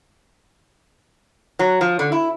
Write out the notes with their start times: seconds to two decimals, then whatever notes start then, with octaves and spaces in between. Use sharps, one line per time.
1.59 F#3
1.81 F3
1.99 D3
2.12 E4